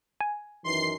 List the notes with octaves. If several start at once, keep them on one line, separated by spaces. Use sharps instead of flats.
G#5
F#2 D#3 E3 C6 C7